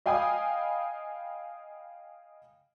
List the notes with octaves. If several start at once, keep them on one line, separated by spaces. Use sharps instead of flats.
D#5 F5 G5 G#5 B5 D#6